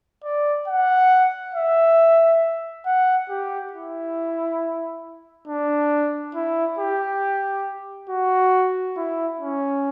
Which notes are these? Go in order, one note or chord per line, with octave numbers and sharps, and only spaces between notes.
D5
F#5
E5
F#5
G4
E4
D4
E4
G4
F#4
E4
C#4